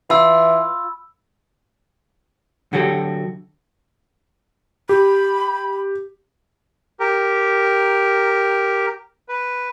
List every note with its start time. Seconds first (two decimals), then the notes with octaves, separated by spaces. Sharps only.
0.10 E3 F4 B5 E6
2.73 D3 F#3 F#4 G4 A4
4.89 G4 B5
7.00 G4 A#4
9.29 B4